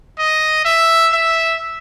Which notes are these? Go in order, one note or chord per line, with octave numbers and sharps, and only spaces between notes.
D#5
E5
E5